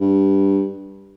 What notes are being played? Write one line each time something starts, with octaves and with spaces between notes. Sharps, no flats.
G2